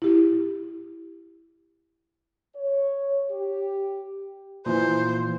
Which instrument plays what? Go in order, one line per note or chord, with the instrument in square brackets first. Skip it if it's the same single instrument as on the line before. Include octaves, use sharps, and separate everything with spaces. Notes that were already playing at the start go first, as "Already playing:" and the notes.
[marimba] E4 G4
[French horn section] C#5
G4
[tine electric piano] A#2 E3 [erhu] C5